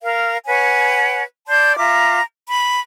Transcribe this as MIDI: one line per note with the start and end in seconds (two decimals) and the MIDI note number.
0.02 0.37 70
0.02 0.37 77
0.45 1.23 71
0.45 1.23 73
0.45 1.23 78
0.45 1.23 80
1.47 1.76 74
1.47 1.76 81
1.47 1.76 84
1.47 1.76 91
1.77 2.20 65
1.77 2.20 76
1.77 2.20 82
1.77 2.20 86
2.48 2.79 83